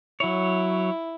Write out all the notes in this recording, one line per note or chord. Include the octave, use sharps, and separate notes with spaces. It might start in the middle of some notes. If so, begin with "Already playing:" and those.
F#3 E4 C#5